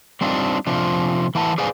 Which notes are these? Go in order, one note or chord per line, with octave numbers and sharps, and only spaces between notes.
G3 C4 D4 D#4 F4
C3 F3 D4
E3 E4 F#5 A5
G#4 B4 C5 D5 F5 G#5